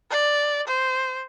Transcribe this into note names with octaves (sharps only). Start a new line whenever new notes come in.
D5
C5